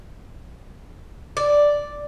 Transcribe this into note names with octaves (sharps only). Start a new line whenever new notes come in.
D5